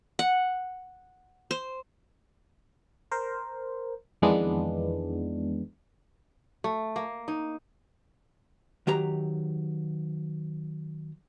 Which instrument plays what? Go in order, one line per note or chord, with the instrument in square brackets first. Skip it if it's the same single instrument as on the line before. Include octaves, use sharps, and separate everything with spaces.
[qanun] F#5
C5
[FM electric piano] A#4 C5
F2 D#3 E3 G#3 B3 D4
[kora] A3
A#3
D#4
[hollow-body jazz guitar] D#3 F#3 G4 A#5